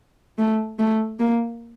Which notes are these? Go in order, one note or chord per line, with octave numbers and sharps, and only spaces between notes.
A3
A3
A#3